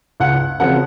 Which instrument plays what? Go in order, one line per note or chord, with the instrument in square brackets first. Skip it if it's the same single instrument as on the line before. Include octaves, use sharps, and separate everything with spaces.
[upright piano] C#2 F#5
C#3 F3 C4 F#5